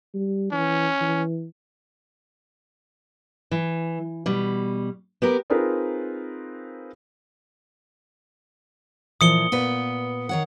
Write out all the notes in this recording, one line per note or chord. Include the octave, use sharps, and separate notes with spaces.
G3
E3 C#4
E3
E3
B2 G3
B3 G4 A#4
C4 D#4 F4 G#4 A#4 B4
A#2 E3 F3 D#6 C#7 G7
A#2 B3 B4
D#3 C#5 F#5